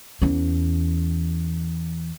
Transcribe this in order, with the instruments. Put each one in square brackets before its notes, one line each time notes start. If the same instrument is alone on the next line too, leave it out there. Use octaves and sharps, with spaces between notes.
[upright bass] E2 C#4